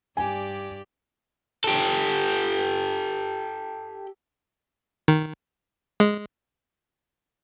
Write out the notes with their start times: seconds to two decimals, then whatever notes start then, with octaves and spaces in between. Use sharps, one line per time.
0.17 G2 G4 D5 G5 G#5
1.64 G4 A4
5.08 D#3
6.00 G#3